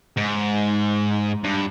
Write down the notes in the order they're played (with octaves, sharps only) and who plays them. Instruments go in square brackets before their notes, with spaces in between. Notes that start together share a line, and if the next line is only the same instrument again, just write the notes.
[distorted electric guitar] G#2
G2